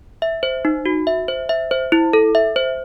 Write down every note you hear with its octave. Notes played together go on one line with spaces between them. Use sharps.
E5
C5
D#4
F#4
E5
C5
E5
C5
E4
A4
E5
C5